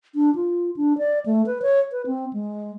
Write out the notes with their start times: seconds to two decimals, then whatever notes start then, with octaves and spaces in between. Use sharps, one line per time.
0.15 D4
0.35 F4
0.77 D4
0.98 D5
1.26 A3
1.46 B4
1.62 C#5
1.91 B4
2.06 C4
2.33 G#3